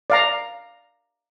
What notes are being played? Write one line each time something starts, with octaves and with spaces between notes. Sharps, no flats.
D5 F5 A#5